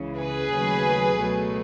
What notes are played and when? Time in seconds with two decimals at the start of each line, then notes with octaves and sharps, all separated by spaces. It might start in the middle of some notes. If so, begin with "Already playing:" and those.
Already playing: C#2 C#3 E3
0.17 G#4 B4
0.51 D#2 C#3 F#3 A3
1.16 C#2 B2 F#3 A3